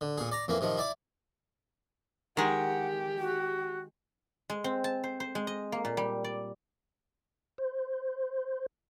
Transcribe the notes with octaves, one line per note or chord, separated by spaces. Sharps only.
D3
A#2 G#4
D5 A#5
F2 E3 A#3
C3 D#3 F3
E4 D5 D6
D#3 G#3 G4 F#5
F#4
G#3
C4
A5
C5
C5
G#3
D#5
A#3
A#2
G3
D5
C5